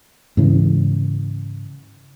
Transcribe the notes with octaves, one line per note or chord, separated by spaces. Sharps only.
G#2 C#3 E3